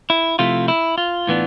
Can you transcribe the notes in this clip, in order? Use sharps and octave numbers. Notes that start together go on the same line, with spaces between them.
E4
C3 F3 A3 E4 F4
E4
F4
A2 E3 B3 D4